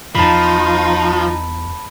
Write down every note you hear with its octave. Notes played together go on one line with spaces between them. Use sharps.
E2 F3 D#4 A5 B5